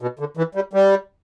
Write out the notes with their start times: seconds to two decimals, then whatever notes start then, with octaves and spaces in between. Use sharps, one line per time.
0.01 B2
0.19 D3
0.37 E3
0.55 G3
0.73 G3